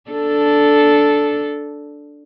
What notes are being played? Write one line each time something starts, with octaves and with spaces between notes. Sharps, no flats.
D4 A4